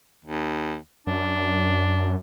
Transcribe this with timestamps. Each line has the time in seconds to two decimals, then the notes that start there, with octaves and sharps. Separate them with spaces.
0.25 D#2
1.07 F#2 D4